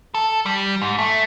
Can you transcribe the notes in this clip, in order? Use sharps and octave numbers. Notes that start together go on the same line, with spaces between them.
A4
G3
G#2
A3